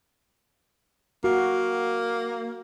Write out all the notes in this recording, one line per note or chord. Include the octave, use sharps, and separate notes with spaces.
A#3 F#4